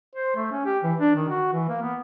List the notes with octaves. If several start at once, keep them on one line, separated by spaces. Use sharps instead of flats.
C5
A3
C#4
G4
E3
D4
D#3
F#4
E3
A#3
B3